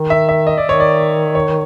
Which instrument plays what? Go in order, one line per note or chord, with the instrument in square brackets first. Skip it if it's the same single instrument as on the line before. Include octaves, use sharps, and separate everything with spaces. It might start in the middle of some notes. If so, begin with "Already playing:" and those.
Already playing: [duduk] D#3
[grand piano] E5
E5
D#5
D5
[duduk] D#3 [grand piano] C#5
[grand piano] D5
C#5